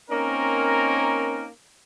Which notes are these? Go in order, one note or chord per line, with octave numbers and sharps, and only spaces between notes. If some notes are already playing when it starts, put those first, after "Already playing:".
A#3 C4 C#4 D#4 A#4